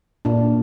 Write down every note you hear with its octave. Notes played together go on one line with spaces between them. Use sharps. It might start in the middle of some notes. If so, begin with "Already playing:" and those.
A#2 D4